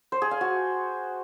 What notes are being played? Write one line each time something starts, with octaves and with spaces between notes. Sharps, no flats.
C5
G#4
F5
F#4